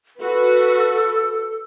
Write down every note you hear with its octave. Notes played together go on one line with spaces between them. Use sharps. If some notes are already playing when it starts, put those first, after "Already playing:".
F#4 A4 B4